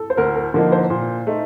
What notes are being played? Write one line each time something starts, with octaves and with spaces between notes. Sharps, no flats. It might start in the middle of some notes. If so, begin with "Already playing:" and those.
Already playing: A4
C5
D2 A#4
A#4
D3 F3 A#3 D#4 A#4
C5
A#2
A3 D#4